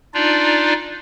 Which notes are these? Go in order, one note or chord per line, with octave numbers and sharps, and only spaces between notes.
D4 D#4 F4 D5